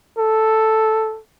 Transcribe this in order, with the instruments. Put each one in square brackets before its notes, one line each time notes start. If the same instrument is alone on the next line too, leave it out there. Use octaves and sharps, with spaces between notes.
[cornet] A4